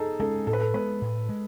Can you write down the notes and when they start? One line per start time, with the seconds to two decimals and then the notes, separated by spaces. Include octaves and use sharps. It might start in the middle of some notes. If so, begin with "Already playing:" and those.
Already playing: D#4 G#4 A4
0.20 G#3 C#4 A4
0.47 A2 A4
0.53 B4
0.61 A4
0.74 G#3 B3 B4
1.02 A2
1.29 G#3